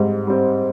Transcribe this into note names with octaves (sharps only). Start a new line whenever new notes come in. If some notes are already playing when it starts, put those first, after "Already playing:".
Already playing: G#2 G3 C4
G3 C4